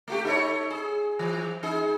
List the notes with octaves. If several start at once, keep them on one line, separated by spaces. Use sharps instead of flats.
A3 F#4 G4
D#4 A4 C#5
G#4
E3
D#4 G#4